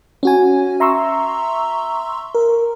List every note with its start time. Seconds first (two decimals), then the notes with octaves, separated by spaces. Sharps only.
0.23 C#4 F#4 G#5
0.80 E5 A#5 C6 C#6 E6
2.35 A#4